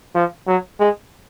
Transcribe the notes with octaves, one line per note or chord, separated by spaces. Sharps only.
F3
F#3
G#3